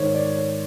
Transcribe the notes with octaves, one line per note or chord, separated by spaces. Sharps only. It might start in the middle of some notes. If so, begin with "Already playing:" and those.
Already playing: G#2 D#3 C5 C#5
D5
C#5